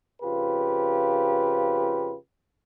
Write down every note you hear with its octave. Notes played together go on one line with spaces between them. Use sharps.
F2 C#3 F4 G4 B4